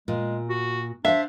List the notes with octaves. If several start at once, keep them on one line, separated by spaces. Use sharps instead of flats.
A#2 G#3
F#4
D4 C5 E5 F5